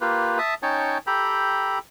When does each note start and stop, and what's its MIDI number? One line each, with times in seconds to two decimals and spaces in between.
0.01 0.38 58
0.01 0.38 65
0.01 0.38 67
0.01 0.38 71
0.38 0.54 76
0.38 0.54 81
0.38 0.54 87
0.63 0.98 61
0.63 0.98 63
0.63 0.98 73
0.63 0.98 79
0.63 0.98 81
1.07 1.79 67
1.07 1.79 69
1.07 1.79 79
1.07 1.79 82
1.07 1.79 83